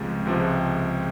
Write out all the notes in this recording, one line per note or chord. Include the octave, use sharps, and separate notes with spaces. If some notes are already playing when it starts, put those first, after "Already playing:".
Already playing: C#2 C3 F3 G#3
C#2 C3 F3 G#3